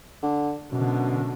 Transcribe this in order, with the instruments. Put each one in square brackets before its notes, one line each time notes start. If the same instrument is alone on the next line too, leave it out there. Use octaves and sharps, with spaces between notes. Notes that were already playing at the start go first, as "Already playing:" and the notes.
[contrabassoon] D3
[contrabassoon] F#2 [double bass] B2 D3